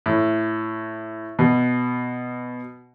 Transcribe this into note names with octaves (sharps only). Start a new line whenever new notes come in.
A2
B2